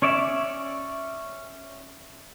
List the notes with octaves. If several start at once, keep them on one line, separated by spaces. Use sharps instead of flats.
C#4 C#5 D5 E5